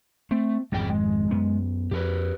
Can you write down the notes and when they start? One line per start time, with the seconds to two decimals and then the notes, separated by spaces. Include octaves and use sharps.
0.31 A3 C4
0.72 G#1 F2 G#2 G3 G#3 G5
0.90 G#3
1.31 F#2 B3
1.91 F2 G4 A#4 B4